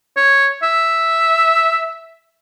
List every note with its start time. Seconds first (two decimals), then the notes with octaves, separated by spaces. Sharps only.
0.17 C#5
0.63 E5